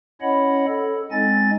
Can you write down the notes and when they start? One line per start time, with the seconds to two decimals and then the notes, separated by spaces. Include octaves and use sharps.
0.21 C#4 E4 C#5 D#5 F#5 B5
0.68 A4
1.11 G#3 C4 D#4 D#5 G#5 A6